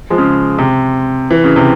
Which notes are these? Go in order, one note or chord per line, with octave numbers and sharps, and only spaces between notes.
F3 G#3
C#3
C3
E3
C#3
C3